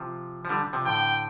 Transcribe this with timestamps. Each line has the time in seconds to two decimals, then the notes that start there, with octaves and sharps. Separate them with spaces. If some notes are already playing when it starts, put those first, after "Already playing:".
Already playing: C3 F3
0.45 F3
0.49 D3 G3
0.73 C3 F3
0.86 A2 D3 G5